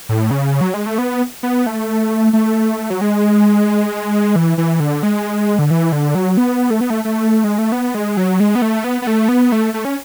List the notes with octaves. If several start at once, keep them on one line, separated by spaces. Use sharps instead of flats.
A2
C#3
F#3
G#3
A3
B3
B3
A3
A3
F#3
G#3
E3
E3
D3
G#3
D3
E3
D3
F#3
B3
A3
B3
A3
A3
G#3
A3
B3
G#3
F#3
G#3
B3
A3
B3
B3
A3
B3
A3
A3
C#4